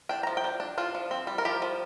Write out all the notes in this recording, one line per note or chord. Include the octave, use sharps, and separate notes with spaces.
D4 G5
F3 A#5
G5
D4
D4
D4 F4
F3
C4
G3
A#4
F3 G4
F3